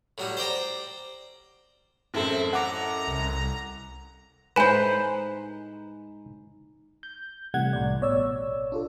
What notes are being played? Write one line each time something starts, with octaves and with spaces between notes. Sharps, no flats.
A2 F#3 G3
C5 D5 G5 A#5
A1 F#2 C4 E4 A4
F#5 A#5 D6
C2
A2 G#3 D#4 B4 C5 G#5 A#5 E7
G6
C3 E3 G3 A3 F#5 G#6
C2 A2 D5
A1 B2 C#5 D5 E6
D4 F4 A4